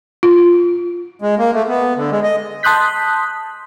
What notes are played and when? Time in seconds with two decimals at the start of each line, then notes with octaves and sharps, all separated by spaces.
0.23 F4
1.22 G#3
1.39 A#3
1.54 A3
1.68 B3
1.97 D3
2.12 G#3
2.23 D#5
2.63 A5 C6 D#6 F#6 G6 B6